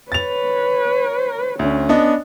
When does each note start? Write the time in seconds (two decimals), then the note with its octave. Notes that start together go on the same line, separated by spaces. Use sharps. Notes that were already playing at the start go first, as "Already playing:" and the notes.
0.12 B4 C#5 A6 F7
1.59 D2 C#4
1.89 B3 D4 D#5